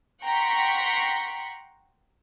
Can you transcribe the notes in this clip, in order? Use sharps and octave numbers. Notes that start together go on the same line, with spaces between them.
F#5 G5 A#5 C6 C#6 B6